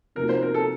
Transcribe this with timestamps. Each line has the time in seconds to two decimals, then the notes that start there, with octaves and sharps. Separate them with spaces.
0.15 C3 F3 A#3 D#4 F#4 A#4
0.29 C5
0.42 A#4
0.54 A4